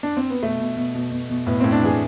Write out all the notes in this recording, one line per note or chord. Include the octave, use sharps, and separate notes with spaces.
D4
C4
B3
B2 A3
B2
B2
B2
B2
B2
A2 B3
A2 C4
D4
E3 G#4